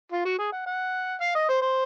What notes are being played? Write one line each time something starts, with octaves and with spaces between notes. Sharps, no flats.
F4
F#4
G#4
F#5
F#5
F5
D#5
C5
C5